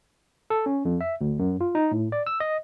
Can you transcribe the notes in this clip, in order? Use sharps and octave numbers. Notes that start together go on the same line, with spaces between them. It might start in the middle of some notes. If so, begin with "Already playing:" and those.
A4
C#4
F2
E5
D2
F#2
F4
D#4
A2
D5
E6
D#5